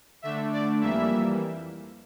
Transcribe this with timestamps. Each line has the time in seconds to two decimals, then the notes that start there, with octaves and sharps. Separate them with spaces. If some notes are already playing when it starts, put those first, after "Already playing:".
0.22 D3 A3 D4 E5
0.52 D5
0.81 F2 E3 G3 A#3 E5